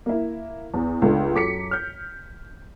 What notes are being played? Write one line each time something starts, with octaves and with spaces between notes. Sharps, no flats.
A#3 E4
E2
C#2 A3 D4
F#2 A4 D6 B6 C#7
F6 G6